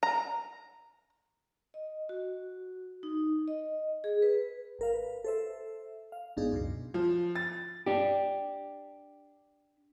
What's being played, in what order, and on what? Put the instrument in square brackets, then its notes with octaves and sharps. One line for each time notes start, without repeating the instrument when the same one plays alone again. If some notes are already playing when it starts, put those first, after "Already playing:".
[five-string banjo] A#5
[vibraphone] D#5
F#4
D#4
D#5
G#4
B4
[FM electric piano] G#1 A#4 F5
B4
A4 C5 E5
F5
A1 G#2 B3 D4 D#4 G#4
C#2 F#2 B2
[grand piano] F3
A6
[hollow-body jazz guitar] D4 G4